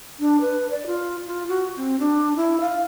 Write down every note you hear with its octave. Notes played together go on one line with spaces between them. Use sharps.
D4
B4
D5
F4
F4
F#4
C4
D4
E4
F5